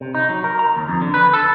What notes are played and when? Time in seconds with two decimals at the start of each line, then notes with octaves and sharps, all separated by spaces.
0.01 C3
0.15 D#4
0.29 F#3
0.44 A#4
0.59 A#5
0.77 D#2
0.88 F2
1.02 D3
1.14 B4
1.33 A4